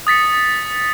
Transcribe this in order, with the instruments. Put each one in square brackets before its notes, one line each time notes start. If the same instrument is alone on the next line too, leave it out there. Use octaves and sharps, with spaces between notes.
[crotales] D#6 A6 B6 C#7